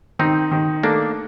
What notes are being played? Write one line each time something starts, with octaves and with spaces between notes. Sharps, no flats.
D#3 C4 D#4
D#3
A3 A#3 D4